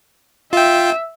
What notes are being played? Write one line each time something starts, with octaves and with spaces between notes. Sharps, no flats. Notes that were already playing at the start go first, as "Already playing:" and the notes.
F4 E5 G5